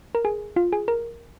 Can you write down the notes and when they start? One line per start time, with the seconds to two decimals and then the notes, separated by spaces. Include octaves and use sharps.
0.15 A#4
0.25 G#4
0.56 F4
0.72 G#4
0.88 A#4